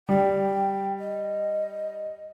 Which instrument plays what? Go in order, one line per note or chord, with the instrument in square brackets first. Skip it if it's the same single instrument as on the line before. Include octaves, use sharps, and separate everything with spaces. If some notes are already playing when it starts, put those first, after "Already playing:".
[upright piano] G3 [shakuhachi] G5
[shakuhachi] D#5